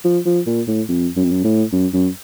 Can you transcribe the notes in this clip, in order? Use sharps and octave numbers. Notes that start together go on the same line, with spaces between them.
F3
F3
A#2
A2
F2
F#2
F2
F#2
A2
F#2
F#2